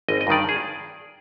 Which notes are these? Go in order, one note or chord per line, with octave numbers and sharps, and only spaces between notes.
G#1 D#5
D#5
G2 D#3 D5
G#4